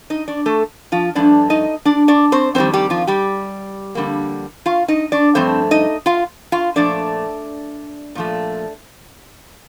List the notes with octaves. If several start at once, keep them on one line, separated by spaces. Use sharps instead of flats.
D#4 D#5
D4 D5
A3 A4
F3 F4
G2 F3 A3 D4 D5
D#4 D#5
D4 D5
D4 D5
C4 C5
F2 D#3 G3 C4 C5
G3 G4
F3 F4
G3 G4
F2 D3 G3 A#3
F4 F5
D#4 D#5
D4 D5
G2 F3 A3 C4 C5
D#4 D#5
F4 F5
F4 F5
A#2 F3 A3 D4 D5
A#2 F3 A3